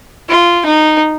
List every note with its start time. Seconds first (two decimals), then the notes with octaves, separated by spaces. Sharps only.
0.29 F4
0.65 D#4